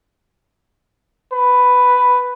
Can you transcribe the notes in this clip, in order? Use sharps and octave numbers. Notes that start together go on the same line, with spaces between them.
B4